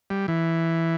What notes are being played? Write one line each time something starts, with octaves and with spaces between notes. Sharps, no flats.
G3
E3